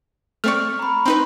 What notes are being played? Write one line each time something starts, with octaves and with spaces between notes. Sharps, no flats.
A3 C4 D5 C#6 F6
A#5 B5
C4 D#4 B4 C6